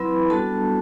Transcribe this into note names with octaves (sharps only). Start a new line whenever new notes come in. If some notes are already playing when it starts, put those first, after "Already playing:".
Already playing: F#3 C4 E4 B4 B5
G3 B3 D4 F#4 A4 A5